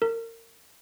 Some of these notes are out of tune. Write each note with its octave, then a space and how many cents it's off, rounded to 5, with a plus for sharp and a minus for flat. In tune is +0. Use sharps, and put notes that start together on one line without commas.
A#4 -30